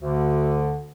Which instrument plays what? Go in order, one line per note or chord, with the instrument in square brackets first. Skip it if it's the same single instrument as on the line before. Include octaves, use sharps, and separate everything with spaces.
[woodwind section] D2 D3